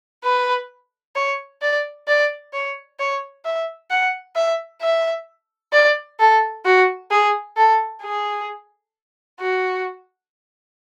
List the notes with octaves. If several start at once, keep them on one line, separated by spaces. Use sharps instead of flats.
B4
C#5
D5
D5
C#5
C#5
E5
F#5
E5
E5
D5
A4
F#4
G#4
A4
G#4
F#4